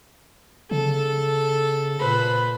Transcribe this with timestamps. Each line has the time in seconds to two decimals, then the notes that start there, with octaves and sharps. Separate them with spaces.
0.71 C#3 A4
1.99 A#2 B4 C5 B5